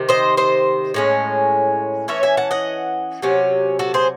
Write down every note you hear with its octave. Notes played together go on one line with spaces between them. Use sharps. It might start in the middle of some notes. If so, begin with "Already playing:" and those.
Already playing: C3 D#3
C5 D#5
C5 D#5
A2 G#3 C#4
E3 A3 C#4 C#5 E5
E5 G#5
F#5 A5
D#5 F#5
C3 F#3 C#4
F#4 A4
G#4 C5